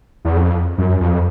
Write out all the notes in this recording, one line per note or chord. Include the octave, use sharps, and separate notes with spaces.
E2
F2
F#2
F2